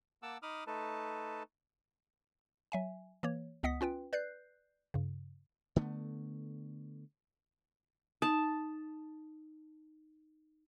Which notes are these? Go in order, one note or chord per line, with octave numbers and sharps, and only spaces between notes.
A#3 F#5 A5 D6 E6
D#4 B5 D6 D#6 F6
A3 D#4 A4 B4 A5
F#3 E5 G#5
E3 A#3 C#5
C#2 B3 D#5 F#5 D#6 B6
C#4 F4 B4 G5
B4 D5 F#6 G6 C7
G2 C#3
D3 A3 B3
D#4 A5